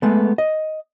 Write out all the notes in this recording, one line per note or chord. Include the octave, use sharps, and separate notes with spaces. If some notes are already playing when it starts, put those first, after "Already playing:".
G#3 A3 B3
D#5